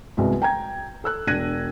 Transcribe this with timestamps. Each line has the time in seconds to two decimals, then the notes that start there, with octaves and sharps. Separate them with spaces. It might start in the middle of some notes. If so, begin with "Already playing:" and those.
0.17 C2 G#3 B3 F#4
0.42 G5 A#5 G#6
1.04 A4 E6 F#6
1.27 E1 D4 F#6 G#6 A#6 D#7